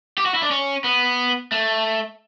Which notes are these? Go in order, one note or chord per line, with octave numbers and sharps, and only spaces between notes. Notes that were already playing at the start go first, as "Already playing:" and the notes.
G4
F#4
E4
D4
C#4
B3
A3